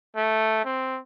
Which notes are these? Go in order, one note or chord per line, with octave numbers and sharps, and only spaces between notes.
A3
C4